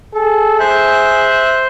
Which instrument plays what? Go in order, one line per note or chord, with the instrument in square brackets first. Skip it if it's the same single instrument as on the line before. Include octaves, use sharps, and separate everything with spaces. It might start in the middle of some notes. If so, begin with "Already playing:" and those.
[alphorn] G#4 [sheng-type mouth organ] A4
[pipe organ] C5 [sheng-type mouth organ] E5 F#6